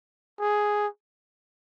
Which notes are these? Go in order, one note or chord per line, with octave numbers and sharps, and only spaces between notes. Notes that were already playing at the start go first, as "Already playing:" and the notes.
G#4